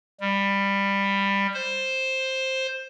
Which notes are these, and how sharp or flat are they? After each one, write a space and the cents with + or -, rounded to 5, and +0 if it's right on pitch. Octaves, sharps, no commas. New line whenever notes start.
G3 +15
C5 +5